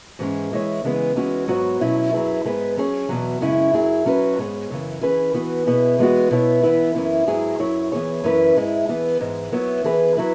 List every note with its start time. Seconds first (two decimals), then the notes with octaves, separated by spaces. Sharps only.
0.19 G#2 E3 G#3 C#4 G#4
0.52 E3 G#3 E4 C#5
0.84 C#3 E3 G#3 B3 G#4
1.16 E3 G#3 C#4 F#4
1.48 G#2 F#3 B3 F#4 C#5
1.80 B2 F#3 C#4 E4 C#5
2.12 F#2 F#3 E4 G#4 B4
2.44 G#2 G#3 B3 G#4 B4
2.77 F#3 C#4 G#4 C#5
3.09 E2 B2 F#3
3.41 F#2 C#3 G#3 C#4 E4
3.73 F#2 F#3 E4 G#4
4.05 F#3 C#4 F#4 B4
4.38 G#2 G#3 B3 G#4 C#5
4.70 F#2 C#3 E3
5.01 E3 C#4 G#4 B4
5.34 E3 B3 F#4
5.67 B2 B3 E4 G#4
5.99 E3 G#3 B3 F#4
6.31 B2 B3 E4 C#5
6.63 E3 B3 E4 B4
6.95 F#2 E3 C#4 E4
7.27 G#2 F#3 E4 G#4
7.59 F#2 F#3 E4 C#5
7.92 E3 B3 G#4 C#5
8.24 F#2 E3 C#4 E4 B4
8.56 G#2 G#3 E4
8.88 E2 E3 B3 G#4
9.21 G#2 E3 G#3
9.52 F#3 B3 E4 C#5
9.84 E3 B3 G#4 B4
10.17 F#3 E4 B4